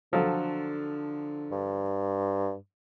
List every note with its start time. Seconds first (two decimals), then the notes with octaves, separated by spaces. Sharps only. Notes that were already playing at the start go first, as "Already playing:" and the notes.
0.13 D3 F3 F#3 A4
1.51 G2